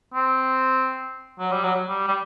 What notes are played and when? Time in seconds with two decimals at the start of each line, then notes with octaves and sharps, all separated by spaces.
0.14 C4
1.39 F#3
1.52 G3
1.64 F#3
1.89 G3
2.08 G3